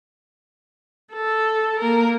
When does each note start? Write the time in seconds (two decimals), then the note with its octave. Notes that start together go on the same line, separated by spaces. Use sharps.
1.14 A4
1.79 A#3 A#4